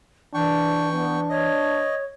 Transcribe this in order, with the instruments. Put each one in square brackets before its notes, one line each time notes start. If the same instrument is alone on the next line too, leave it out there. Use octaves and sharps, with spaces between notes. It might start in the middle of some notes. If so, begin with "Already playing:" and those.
[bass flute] E3 [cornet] D4 [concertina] G5 C#6
[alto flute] B3 [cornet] D4
[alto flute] C#5 [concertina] D#5